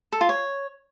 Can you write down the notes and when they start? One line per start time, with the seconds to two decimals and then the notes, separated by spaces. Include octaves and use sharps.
0.12 A4
0.21 F4
0.29 C#5